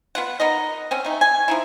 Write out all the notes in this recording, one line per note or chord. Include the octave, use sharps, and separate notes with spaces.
B3 F4 F#5
B3 D#4 A#4 D#5
C4 C#4
A3 D#4
G#5
F3 D#4 E4